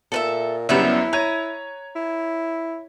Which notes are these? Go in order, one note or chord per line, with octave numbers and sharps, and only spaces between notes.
A#2 A4 B4 E5
F#1 F#2 G3 B3 E4 B4 E5
C#5 A#5 G#6 D#7
E4